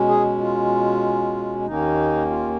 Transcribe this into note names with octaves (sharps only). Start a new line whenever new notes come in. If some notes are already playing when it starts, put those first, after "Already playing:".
Already playing: B2 G#3 C#4
G#4
F4
D#2 D#3 A#3 C#4 D#4
F4